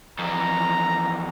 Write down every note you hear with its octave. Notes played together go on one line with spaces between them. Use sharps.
F2 E3 A#5